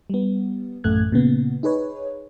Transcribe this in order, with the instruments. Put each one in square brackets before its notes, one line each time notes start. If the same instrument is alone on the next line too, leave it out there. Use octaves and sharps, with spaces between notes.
[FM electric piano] G3 B3
A1 F#2 A3 F#6 G#6
A#2 C#3 B3
D#4 G#4 B4 C#5